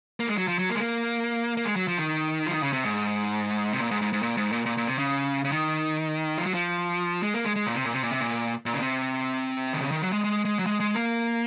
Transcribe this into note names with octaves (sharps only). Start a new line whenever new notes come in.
A#3
G#3
F#3
F3
F#3
A#3
G#3
A#3
A#3
G#3
F#3
F3
D#3
F3
D#3
C#3
C3
G#2
C3
A#2
G#2
G#2
G#2
A#2
G#2
A#2
A#2
A#2
C3
C#3
C#3
D#3
F3
F#3
F3
G#3
A#3
G#3
G#3
A#2
C3
A#2
C3
A#2
C3
A#2
A#2
C#3
C3
D#3
C#3
D#3
F#3
G#3
G#3
G#3
F#3
G#3
G#3
A#3